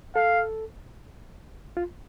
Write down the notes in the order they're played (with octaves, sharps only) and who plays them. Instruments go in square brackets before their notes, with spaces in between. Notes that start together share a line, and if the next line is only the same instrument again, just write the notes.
[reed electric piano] A4 [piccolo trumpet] F5
[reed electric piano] F4